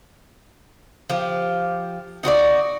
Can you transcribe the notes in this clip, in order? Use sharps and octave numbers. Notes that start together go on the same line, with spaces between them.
F3 G4
D#4 F#4 C5 D5